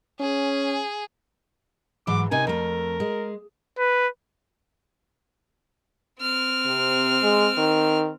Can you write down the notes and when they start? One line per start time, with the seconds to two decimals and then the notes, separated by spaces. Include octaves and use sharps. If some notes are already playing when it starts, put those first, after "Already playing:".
0.20 C#4 G#4
2.07 G#2 E3 F#3 D6
2.31 C3 D#4 A#4 G#5
2.47 F2 A3 A#4
3.00 G#3
3.78 B4
6.20 C4 F6
6.66 C3
7.23 G#3
7.57 D#3